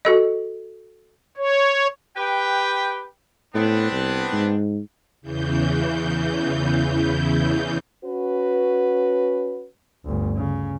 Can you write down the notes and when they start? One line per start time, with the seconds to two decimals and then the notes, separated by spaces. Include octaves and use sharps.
0.05 F#4 A4 D#5
1.37 C#5
2.16 G4 B4 G5
3.55 A2 B3 C4 D4
3.91 C2
4.33 G#2
5.21 E2 C#3 E3 G6
8.05 C#4 F#4 B4
10.05 G1 D2
10.36 C#3